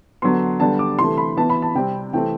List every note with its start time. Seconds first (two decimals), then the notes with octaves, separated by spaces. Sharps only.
0.22 D3 F#3 B3 C6
0.60 D3 G3 B3 A5
0.79 D6
0.99 C3 E3 A3 C6
1.18 B5
1.37 E3 B3 A5
1.50 B5
1.62 A5
1.75 C3 G3 C4 G5
2.13 C3 E3 A3 C4 G5